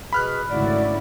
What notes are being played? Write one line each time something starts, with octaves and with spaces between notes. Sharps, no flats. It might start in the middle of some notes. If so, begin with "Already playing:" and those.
B2 G#4 B4 B5 F6 F#6
G#1 D2 C#3 E4 F#4 D5